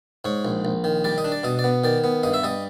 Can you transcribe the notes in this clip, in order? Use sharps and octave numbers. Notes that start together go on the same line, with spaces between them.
G#2 C#5
A#1
A#1
D#3
G3 D5
D#5
D4
D5
B2 D#5
D5
B3
D#3 D5
B3
G2 D#5
E5
G3 D#5